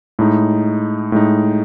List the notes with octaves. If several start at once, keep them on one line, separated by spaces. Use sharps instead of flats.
A2 G#3 D#4
A2 G#3 D#4